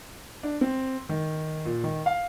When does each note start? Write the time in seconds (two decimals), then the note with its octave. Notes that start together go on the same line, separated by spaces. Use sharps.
0.43 D4
0.61 C4
1.09 D#3
1.65 A#2
1.84 D#3
2.06 F5